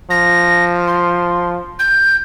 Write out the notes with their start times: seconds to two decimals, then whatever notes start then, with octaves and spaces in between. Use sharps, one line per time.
0.10 F3 A#6
0.87 C6
1.79 G6